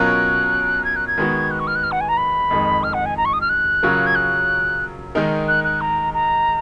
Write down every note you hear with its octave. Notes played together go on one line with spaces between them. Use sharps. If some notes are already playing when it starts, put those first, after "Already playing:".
Already playing: B2 F#3 C#4 F4 A#4 F#6
G#6
F#6
G#6
D#3 G#3 B3 F#4
F#6
C#6
F6
F#6
F6
F#5
G#5
A#5
B5
F2 D#3 G#3
F6
F#5
G#5
A#5
C#6
D#6
F6
F#6
C#3 F#3 C#4 F4 A#4
G#6
F#6
D#3 G#3 D#4 A#4
F#6
F#6
A#5
A#5